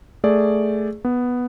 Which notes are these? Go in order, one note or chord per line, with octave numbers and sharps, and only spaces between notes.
A3 G#4 D5
B3